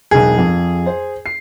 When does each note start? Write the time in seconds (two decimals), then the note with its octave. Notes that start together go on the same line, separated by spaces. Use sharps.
0.11 E1 B1 G#4
0.38 F2
0.86 C5
1.26 C7